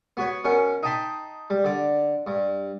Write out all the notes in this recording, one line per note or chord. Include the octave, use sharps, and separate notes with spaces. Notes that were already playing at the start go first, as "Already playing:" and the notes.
B3 F#4 B4 C#5
B2 C#4 A#4 F#5
D#4 D#5 G5 A5 B5 C6
G3
D3 D5
G2